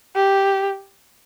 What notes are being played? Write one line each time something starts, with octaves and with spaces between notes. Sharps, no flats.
G4